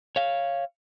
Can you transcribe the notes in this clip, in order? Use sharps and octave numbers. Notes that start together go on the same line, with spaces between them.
C#5 F5